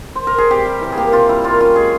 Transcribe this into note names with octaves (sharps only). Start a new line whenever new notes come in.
C5
A#4
G#4
C3 G4
G3
E3
G#4
A#3 G4
C3 F4
G3 E4
A#2 F4
C#4 F4
G#3 G#4